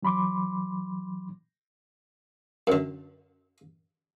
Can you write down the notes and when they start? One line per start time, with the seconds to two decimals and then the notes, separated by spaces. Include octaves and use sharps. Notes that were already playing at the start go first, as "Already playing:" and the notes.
0.03 E3 F#3 B5 C6 D6
2.67 F#2 D3